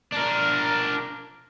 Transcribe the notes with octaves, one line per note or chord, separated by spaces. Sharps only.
D4 A#4